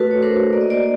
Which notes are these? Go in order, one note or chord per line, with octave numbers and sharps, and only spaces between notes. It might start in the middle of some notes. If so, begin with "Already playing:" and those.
Already playing: A3 F#4 A4 B4
C#5
D4 A#4 C5
A#3 D5
D#5
C5 D5